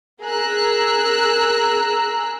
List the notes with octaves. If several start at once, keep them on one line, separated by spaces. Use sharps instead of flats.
G#4 A#4 A#5 E6 F#6